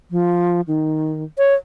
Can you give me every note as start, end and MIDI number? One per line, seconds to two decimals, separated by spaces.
0.11 0.61 53
0.68 1.24 51
1.38 1.54 73